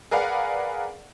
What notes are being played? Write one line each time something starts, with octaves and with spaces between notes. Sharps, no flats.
G#4 A#4 B4 D5 F5 F#5